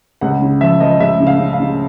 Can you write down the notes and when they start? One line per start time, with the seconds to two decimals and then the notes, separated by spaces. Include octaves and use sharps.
0.21 C#2 F#5
0.42 C#3
0.61 F3 E5
0.80 F3 D#5
1.00 C#2 E5
1.20 C#3
1.27 F5
1.39 C#3
1.53 F5
1.59 C#3